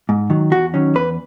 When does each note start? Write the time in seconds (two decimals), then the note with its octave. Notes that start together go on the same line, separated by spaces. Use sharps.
0.09 G#2
0.30 D#3 F#3
0.51 E2 F#4
0.74 D#3 F#3 C#4
0.95 E2 B4